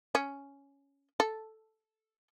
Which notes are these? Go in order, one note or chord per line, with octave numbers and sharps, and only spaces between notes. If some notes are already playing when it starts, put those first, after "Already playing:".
C#4
A4